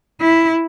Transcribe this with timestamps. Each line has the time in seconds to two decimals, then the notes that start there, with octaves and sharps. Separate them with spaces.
0.21 E4